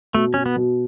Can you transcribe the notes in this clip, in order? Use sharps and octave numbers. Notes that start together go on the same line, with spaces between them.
B2 A3
B2 C#4
B3
B2